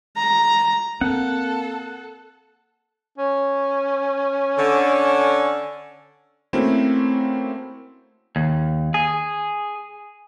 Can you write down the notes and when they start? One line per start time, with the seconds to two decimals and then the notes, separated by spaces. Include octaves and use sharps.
0.17 A#5
1.01 A#3 C4 A4 F#5
3.18 C#4
4.58 D3
6.53 A3 A#3 C4 C#4 E4 F#4
8.36 D#2
8.94 G#4